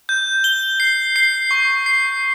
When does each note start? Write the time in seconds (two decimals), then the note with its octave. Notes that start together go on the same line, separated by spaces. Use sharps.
0.09 G6
0.44 G7
0.80 C7
1.16 C7
1.51 C#6
1.86 C7